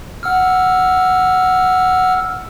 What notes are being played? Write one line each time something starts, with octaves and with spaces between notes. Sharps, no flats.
F#5 E6 F6